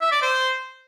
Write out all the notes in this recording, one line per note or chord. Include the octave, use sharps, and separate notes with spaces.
E5
D5
C5